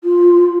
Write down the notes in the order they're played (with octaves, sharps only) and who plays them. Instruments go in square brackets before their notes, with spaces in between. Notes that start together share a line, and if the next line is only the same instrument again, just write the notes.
[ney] F4